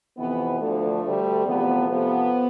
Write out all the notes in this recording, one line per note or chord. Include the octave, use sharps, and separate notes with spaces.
F2 C3 E3 B3
D2 D3 F3 A3
D2 D3 G3
E2 C3 F3 A3 B3
F2 C3 F3 A3 B3